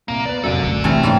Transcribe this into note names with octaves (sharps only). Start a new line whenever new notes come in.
C2 A#3 F7
B3 B4 D5
F1 F#2 F#3 A4 D5
C#2 A3 C#7
C3 E3 A3 C#4 E5 A5
G#2 G3 A#3 C#4